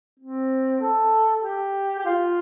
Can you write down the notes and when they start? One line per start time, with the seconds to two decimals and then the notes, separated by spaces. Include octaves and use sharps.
0.20 C4
0.81 A4
1.43 G4
1.99 G4
2.05 F4